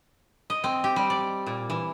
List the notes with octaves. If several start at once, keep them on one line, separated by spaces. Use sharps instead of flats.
D#5
C4
G4
G3
D5
A#2
E3